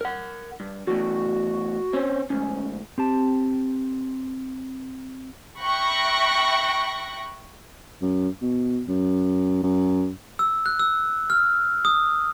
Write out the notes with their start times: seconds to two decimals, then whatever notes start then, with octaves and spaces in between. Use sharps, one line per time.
0.01 A#4 F#5
0.60 G2
0.87 E2 A2 F#4
1.93 C4 C#4
2.30 D2 G#2 C#4
2.98 C4 G4 A5
5.61 E5 G5 B5 C#6 F#6 A#6
8.02 F#2
8.42 B2
8.88 F#2
9.63 F#2
10.39 E6
10.66 F#6
10.79 E6
11.30 F6
11.85 D#6